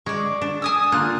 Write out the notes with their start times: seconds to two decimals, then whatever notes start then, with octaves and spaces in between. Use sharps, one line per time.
0.06 G#3 D5 C#6
0.41 D4
0.62 G#5 D#6 E6
0.92 D3 A#3 F4 F#6